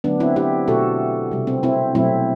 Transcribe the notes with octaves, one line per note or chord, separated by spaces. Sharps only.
D3 F#3 A3 B3 D4
C4 E4
E4 G4
B2 A3 F#4 A4
C3 G3
C4
C4 E4
B2 F#3 A3 C4 E4